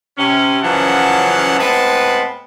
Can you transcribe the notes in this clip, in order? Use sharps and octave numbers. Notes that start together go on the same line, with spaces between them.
C3 C#4
F#2 C#3 E3 F3 F#5 A5
A2 G#3 B3 C4 B4 A5